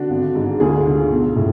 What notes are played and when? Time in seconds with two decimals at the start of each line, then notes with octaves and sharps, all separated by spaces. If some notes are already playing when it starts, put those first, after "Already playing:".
Already playing: D3 D4 F#4
0.10 G#1
0.35 G#2
0.60 D2 F4 G#4
0.85 D3 F4 G#4
1.10 B1
1.36 A2